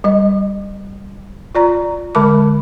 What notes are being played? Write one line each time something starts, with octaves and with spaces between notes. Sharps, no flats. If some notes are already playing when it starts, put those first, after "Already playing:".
G3 D#5
F4 D5 A#5
D3 G#3 A#4 A5 D6